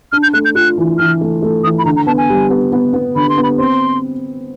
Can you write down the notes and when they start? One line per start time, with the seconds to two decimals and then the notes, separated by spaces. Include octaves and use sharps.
0.12 D4 F6
0.23 G6
0.33 A3 F#6
0.45 G6
0.55 F4 F#6
0.78 E3
0.98 E3 F6
1.21 A3
1.42 A3
1.64 E3 D#6
1.79 B5
1.85 D3 A#5
1.96 A#5
2.07 B3 A5
2.18 G#5
2.29 G3
2.50 B3
2.72 B3
2.93 B3
3.15 D3 B5
3.29 C6
3.37 B3
3.43 B5
3.58 C4 C6